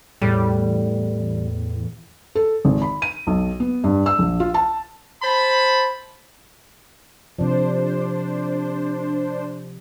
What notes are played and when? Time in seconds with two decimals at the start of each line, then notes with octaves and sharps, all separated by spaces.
0.22 E2 A2 G3
2.35 A4
2.65 G#1
2.82 B5
3.02 D#7
3.27 B1
3.60 B3
3.84 G2
4.06 E6
4.19 A#1
4.40 F4
4.54 A5
5.22 C5 A5 B5
7.39 C3 F3 D4 C5